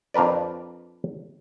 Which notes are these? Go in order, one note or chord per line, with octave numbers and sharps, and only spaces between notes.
F2 D4 A#4 B4 D5